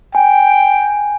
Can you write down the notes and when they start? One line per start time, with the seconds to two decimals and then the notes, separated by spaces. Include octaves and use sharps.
0.15 G5 G#5